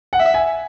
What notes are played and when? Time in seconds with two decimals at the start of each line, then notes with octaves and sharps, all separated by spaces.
0.13 F#5
0.20 E5
0.34 G#5